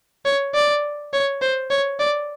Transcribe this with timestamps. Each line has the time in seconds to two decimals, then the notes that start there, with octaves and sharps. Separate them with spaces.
0.25 C#5
0.54 D5
1.13 C#5
1.42 C5
1.70 C#5
1.99 D5